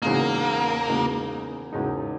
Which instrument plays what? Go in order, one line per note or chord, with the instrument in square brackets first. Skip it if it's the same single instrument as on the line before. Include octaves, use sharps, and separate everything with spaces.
[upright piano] E1 E2 C#3 G#3 D#4 [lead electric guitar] A#3
[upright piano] E1 E2 C#3 G#3 D#4
E1 E2 C#3 G#3 D#4